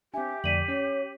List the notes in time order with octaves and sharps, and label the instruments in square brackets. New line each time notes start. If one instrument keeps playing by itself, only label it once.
[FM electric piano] C4 D4 [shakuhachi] G4 [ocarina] E5 [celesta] G#5
[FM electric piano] F2 D3 A3 [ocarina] D5 [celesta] B6 D#7 F#7
[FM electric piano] C#4 [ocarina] C#5